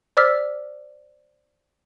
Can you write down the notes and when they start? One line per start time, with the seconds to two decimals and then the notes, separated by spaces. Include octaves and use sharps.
0.17 C5 D5 D6 E6 F6 B6